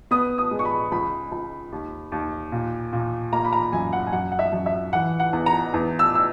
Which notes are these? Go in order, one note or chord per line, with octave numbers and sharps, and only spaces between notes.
B3 D#6
D#6
G#3
C#6
B5
C#2 B5
C#2
D#2
D#2
A#2
A#2
A#3 A#5
B5
A#5
F#2 G#5
F#5
G#5
F#2 F#5
F#5
E5
F#2
E5
E3 F#5
F#5
E2
A#5
E2
E6
E6